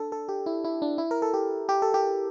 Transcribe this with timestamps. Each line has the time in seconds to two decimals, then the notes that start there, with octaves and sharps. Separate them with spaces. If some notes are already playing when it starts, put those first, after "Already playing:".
Already playing: D4 A4
0.12 A4
0.29 G4
0.46 E4
0.64 E4
0.82 D4
0.98 E4
1.11 A#4
1.22 A4
1.34 G4
1.69 G4
1.82 A4
1.94 G4